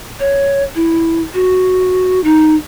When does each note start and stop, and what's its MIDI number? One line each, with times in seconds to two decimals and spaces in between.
0.20 0.64 73
0.75 1.22 64
1.34 2.20 66
2.24 2.55 63